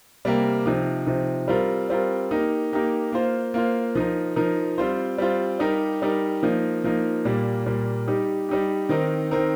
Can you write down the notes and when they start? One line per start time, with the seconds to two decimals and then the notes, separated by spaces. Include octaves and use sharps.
0.25 C3 G3 A#3 G4 A#4
0.66 C3 F3 D#4
1.06 C3 F3 D#4
1.48 G3 C4 F4 A#4
1.90 G3 C4 F4 A#4
2.31 A#3 D#4 G4 A#4
2.72 A#3 D#4 G4 A#4
3.12 A#3 F4 C5
3.54 A#3 F4 C5
3.95 F3 D#4 A#4
4.36 F3 D#4 A#4
4.78 G3 C4 F4 C5
5.18 G3 C4 F4 C5
5.60 G3 D#4 G4 A#4
6.02 G3 D#4 G4 A#4
6.43 F3 A#3 D#4
6.84 F3 A#3 D#4
7.25 A#2 G3 A#3
7.66 A#2 G3 A#3
8.07 G3 D#4 G4
8.49 G3 D#4 G4
8.89 D#3 C4 D#4 A#4
9.31 D#3 C4 D#4 A#4